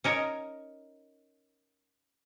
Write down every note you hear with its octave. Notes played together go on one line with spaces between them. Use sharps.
C#4 D#4 A#4 C#5